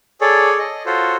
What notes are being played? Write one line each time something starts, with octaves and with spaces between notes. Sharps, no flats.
G#4 A4 C#5 D5
D#5
F4 F#4 A4 C5 C#5